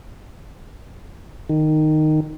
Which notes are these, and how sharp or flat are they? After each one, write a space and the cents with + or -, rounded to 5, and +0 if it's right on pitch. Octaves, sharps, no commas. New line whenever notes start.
D#3 -10